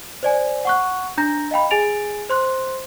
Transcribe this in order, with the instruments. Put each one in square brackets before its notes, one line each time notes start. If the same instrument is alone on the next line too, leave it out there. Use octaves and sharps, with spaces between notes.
[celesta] C5 D5 G#5
F#5 C#6 F#6
D4 A#5 G6 A#6
D#5 F5 G5 B5
G#4 G#5 A6 D7 F7
C5 C6 F#6